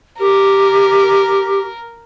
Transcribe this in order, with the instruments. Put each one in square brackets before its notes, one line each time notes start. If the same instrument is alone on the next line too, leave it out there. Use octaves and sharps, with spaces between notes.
[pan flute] G4 [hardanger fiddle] A#4